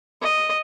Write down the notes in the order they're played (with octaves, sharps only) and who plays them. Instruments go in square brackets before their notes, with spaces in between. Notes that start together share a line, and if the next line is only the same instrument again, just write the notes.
[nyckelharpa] D#5